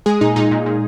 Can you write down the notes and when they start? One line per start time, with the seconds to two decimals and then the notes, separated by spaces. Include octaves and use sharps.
0.06 G#3 G#4
0.21 A#2 D#4
0.36 A#2 D#4
0.51 A#2
0.66 A#2